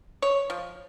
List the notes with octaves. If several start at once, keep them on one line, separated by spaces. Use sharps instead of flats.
C#5
F3